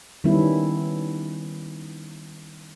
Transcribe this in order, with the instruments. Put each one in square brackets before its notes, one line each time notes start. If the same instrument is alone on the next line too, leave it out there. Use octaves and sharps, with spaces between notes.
[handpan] D#3 G3 B3 C#4 D#4 E4